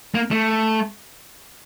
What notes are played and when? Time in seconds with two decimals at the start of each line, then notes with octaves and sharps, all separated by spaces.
0.15 A#3
0.31 A3